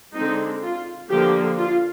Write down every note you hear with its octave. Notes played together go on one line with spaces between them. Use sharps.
D3 G#3 C4 D#4
F4
D3 F3 A#3 G4
F4